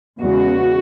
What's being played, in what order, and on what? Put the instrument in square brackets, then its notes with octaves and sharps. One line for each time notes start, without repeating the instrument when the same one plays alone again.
[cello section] E2 C#3 G#3 F#4